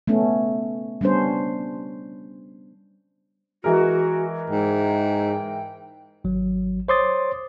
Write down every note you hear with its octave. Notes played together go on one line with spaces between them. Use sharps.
A3 B3 C#4
G3 B3 C#4 D4 C5
E3 G#3 F#4 A#4
G#2 G5
G#1 F#3
C5 C#5 C6 D6 D#6 A6